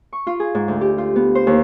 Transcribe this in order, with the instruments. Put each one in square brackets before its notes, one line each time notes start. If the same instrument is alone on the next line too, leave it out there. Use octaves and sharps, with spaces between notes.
[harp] C#6
F4
G#4
G#2
D2
G4
F4
B3
C5
D#2